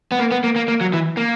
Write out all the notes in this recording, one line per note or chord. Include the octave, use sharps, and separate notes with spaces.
B3
A#3
B3
A#3
A#3
A#3
F#3
E3
A#3